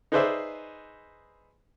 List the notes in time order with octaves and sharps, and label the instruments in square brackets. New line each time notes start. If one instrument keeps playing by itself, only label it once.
[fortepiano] D#4 G#4 B4 C5 D5 E5